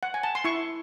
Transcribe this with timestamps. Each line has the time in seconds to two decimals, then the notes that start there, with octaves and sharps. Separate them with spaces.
0.03 F#5
0.14 G#5
0.23 A5
0.35 C6
0.44 E4 C#6